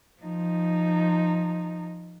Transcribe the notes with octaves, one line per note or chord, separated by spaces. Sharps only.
F3 D#4